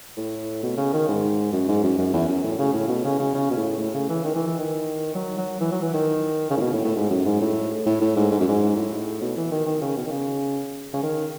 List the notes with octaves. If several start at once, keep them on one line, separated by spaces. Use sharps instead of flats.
A2
B2
C#3
D#3
G#2
F#2
G#2
F#2
F#2
E2
F#2
A2
C#3
A2
B2
C#3
C#3
C#3
B2
A2
A2
C#3
E3
D#3
E3
E3
D#3
F#3
F#3
E3
F#3
E3
D#3
C#3
A2
B2
A2
A2
G#2
F#2
G#2
A2
A2
A2
G#2
G#2
F#2
G#2
A2
B2
E3
D#3
D#3
C#3
B2
D#3
C#3
C#3
D#3